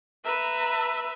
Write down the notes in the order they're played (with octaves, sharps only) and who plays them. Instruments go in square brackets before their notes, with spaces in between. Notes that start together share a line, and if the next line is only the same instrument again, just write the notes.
[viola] B4 E5 [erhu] A#5